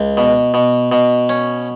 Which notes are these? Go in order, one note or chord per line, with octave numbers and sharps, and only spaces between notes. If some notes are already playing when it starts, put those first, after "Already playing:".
Already playing: C#2
B2
B2
B2
C#4